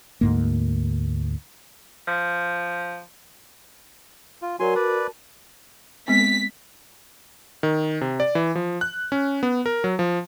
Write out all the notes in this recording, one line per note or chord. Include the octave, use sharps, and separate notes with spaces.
D2 G#2 A#3
F3
F4
F#3 F#4 A#4 D5 G#5 C6
B4 D5 A5
G#3 B3 C4 B6
D#3
C3
D5
E3
F3
F#6
C#4
B3
A#4
F#3
F3